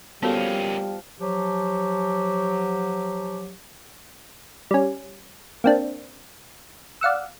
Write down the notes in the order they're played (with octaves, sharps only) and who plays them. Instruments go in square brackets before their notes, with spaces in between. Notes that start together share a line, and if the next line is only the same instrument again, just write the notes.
[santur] F3 F5 [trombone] G3 [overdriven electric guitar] A#3 C#4 [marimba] B3 F#4 A4
[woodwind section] F3 F#3 G4
[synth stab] G3 C#4
A#3 C4 D4
D5 F5 F#5 E6